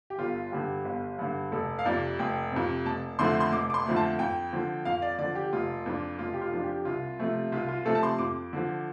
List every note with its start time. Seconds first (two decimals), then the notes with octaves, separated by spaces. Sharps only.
0.10 G4
0.19 G1 F4
0.52 G2 D3 G4
0.85 G1
1.19 G2 D3
1.52 F1 A4
1.79 F5
1.85 F2 C3 D5
2.19 F1 G5
2.52 F2 C3
2.85 F1 A5
3.19 F2 D3 F3 A3 C6
3.40 C6
3.52 F1 D6
3.70 D6
3.74 C6
3.86 F2 D3 F3 A3
3.96 A5
4.19 F2 G5
4.53 D3 F3
4.85 F2 F5
5.02 D5
5.19 D3 F3 D5
5.35 G4
5.53 F1 F4
5.86 F2 F3 D4
6.19 F1 F4
6.34 G4
6.41 F4
6.52 F2 F3 D4
6.64 G4
6.85 C2 F4
7.19 C3 F3 A3
7.52 C2 F4
7.68 F4
7.85 C3 F3 A3 A4
7.95 A5
8.03 C6
8.19 F2 D6
8.53 D3 F3